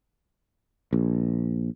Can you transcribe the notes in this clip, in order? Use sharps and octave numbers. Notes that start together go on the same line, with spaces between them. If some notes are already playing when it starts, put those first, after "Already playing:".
A#1